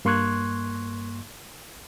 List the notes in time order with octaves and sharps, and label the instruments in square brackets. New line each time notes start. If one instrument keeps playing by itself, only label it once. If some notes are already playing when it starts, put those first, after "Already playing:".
[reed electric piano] G2 A#3 C6 C#6 F#6 G#6